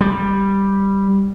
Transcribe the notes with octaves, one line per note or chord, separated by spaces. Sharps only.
G3